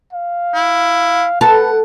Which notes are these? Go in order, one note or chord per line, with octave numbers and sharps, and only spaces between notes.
F5
E4
A4 B4 F#5